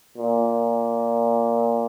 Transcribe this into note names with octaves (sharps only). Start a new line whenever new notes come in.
A#2